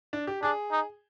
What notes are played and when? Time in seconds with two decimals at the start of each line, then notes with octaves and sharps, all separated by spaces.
0.13 D4
0.27 G4
0.42 D4 G#4
0.71 D#4